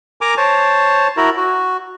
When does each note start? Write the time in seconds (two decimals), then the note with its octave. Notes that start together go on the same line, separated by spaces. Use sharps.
0.21 A#4 G#5 A#5 D6
0.37 C5 C#5 A5
1.17 E4 F#4 A#4
1.37 F#4